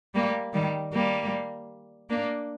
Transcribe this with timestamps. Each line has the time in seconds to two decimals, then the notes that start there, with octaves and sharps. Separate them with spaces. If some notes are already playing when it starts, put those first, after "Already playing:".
0.15 G3 A#3
0.53 D#3 G3
0.93 G3 A#3
2.10 A#3 D4